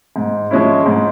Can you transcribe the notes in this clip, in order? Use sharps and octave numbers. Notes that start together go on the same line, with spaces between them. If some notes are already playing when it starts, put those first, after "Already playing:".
G#2
F3 G#3 C#4 E4
G#2